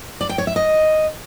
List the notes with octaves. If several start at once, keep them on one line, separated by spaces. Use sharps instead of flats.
D5
G5
C#5
E5
D#5